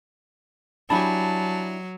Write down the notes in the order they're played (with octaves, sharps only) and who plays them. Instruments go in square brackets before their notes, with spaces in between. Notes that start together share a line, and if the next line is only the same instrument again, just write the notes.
[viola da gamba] F#3 [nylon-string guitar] D4 E4 [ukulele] G4 G#5 B5 [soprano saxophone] A5